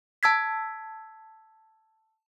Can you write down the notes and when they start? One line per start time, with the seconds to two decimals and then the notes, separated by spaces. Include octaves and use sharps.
0.23 A5 E6 G#6 B6